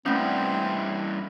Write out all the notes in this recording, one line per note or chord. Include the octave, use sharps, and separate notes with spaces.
G2 E3 A3 C4 C#4